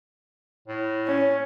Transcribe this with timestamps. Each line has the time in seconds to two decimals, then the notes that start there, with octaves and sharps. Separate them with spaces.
0.68 A2
1.07 C#4